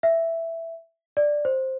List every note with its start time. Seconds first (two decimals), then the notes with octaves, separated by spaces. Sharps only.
0.03 E5
1.17 D5
1.45 C5